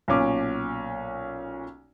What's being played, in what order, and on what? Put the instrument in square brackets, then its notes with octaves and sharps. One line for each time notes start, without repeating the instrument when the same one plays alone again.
[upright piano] B1 A#2 C#4 D6